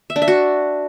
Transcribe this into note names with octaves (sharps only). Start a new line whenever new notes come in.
E5
D4
E5
F#4